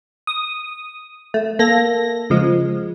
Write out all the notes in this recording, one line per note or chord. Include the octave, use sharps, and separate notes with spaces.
D#6
A3
A#3 A4 A#6
C#3 F3 G#3